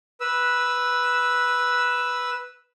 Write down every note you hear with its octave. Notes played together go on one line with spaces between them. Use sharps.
B4 E6